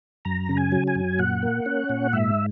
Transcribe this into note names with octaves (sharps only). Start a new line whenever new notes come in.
F#2 A#5
C#3
G#5
F#3
G#5
F#2
A#2 F#5
A#3
C#4
A#2
G#2 E5